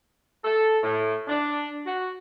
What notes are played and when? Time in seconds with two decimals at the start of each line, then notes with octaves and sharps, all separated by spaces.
0.45 A4
0.83 A2
1.28 D4
1.86 F#4